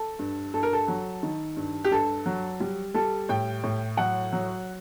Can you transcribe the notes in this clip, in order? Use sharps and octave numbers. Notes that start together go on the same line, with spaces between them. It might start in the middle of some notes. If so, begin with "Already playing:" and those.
Already playing: A4
G2
G2 A4
A#4
A4
F#3
D#3
G2
G4
G2 A4
F#3
G3
G3 A4
A2 G5
A2
F#3 F#5
F#3